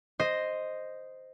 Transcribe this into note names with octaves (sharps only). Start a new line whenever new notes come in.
C5 D#5